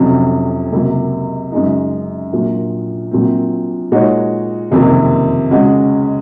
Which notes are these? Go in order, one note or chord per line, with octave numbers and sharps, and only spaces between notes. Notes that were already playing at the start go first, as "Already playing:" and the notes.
Already playing: F1 F2 C3 F#3 C#4
C#2 C3 F#3 A#3
F#2 C#3 G#3 D#4
A#1 A#2 F#3
A#1 A#2 F#3 C4
A#2 G#3 D#4 F#4 C#5
F#1 F2 C3 D#3 A#3
C#2 C#3 G#3 C#4 F#4